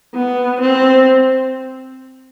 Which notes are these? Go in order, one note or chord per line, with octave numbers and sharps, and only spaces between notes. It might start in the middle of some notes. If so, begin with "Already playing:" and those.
B3
C4